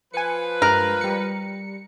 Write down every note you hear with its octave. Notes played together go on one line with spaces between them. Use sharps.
F3 B4 G#5 C#7
G2 G#3 A#4 F#6
G3 C#7